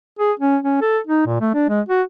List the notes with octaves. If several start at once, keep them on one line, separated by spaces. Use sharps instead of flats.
G#4
C#4
C#4
A4
D#4
A#2
A3
D4
G#3
F#4